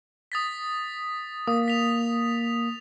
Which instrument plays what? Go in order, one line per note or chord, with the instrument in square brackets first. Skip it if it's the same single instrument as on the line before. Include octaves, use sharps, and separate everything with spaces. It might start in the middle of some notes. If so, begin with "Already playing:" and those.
[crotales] D#6 A6 B6
[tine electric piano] A#3 [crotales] D#6
[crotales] B6 F7